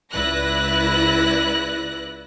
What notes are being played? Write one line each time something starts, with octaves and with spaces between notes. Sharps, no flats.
C#2 E4 B4 D5 F#6 A#6